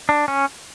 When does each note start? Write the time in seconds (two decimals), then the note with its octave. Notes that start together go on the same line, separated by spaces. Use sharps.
0.09 D4
0.28 C#4